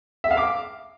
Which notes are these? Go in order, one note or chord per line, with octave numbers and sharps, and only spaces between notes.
E5
F5
D6